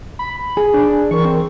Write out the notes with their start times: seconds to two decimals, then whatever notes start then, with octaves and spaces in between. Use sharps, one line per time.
0.19 B5
0.57 G#4 G#5
0.74 D4
1.11 E3 A#4 C#6
1.25 C4